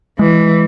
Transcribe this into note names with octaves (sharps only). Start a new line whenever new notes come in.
E3 G#3